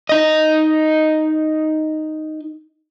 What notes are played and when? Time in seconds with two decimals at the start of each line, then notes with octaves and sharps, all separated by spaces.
0.09 D#4 D#5